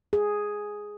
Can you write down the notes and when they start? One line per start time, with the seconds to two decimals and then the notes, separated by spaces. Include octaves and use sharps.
0.13 G#4